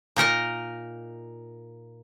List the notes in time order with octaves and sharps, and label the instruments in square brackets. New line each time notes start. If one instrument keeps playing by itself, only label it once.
[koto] A#2 D#4 A#4 D#5